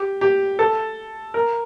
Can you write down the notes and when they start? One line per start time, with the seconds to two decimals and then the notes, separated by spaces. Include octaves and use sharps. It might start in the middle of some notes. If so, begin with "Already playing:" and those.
Already playing: G4
0.21 G4
0.59 A4
1.34 A#4